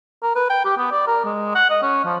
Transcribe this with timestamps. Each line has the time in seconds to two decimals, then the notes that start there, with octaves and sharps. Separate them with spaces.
0.22 A#4
0.36 B4
0.50 G5
0.65 G4
0.77 B3
0.92 D5
1.07 A#4
1.25 G#3
1.55 F#5
1.70 D#5
1.82 C#4
2.05 F3